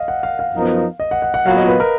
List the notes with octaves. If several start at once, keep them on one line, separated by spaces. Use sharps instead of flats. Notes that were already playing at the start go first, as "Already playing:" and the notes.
Already playing: D#5 F5
F#5
F5
F5
F#2 F3 B3 D#4 A#4
D#5
F#5
F#5
F#5
A#2 F#3 B3 F4 F5
D#5
B4
A#4